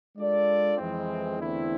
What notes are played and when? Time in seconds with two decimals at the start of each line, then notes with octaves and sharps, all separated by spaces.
0.17 G#3 D4 F4 A4 D5
0.77 F2 E3 G#3 C4
1.38 E2 D3 A3 C4 E4